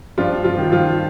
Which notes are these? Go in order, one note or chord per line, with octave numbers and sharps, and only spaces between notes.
G2 F3 F4
F3 F4
D#3
F3 F4